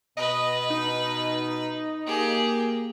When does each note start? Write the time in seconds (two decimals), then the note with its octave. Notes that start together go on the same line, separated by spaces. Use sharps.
0.17 B2 B4 D#5
0.70 D#4
2.07 A#3 G4 G#4